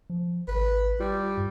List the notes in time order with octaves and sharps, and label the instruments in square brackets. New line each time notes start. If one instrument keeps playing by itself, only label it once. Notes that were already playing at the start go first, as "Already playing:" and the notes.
[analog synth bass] F3
[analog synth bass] G#1 [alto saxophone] B4
[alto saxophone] G3 [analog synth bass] F4
[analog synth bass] G2